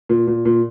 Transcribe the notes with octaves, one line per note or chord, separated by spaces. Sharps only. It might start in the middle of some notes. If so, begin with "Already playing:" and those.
A#2
A#2
A#2